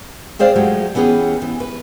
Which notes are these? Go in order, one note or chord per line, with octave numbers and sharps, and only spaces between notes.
C4 G#4 C5 D5 F5
F3 F#3 G#3 A3 G4
E3 B3 C#4 G4 G#4
E3
B4